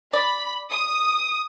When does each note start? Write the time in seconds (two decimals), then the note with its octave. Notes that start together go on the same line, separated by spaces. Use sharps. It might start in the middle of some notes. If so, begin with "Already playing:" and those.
0.13 D5 B5
0.70 D#6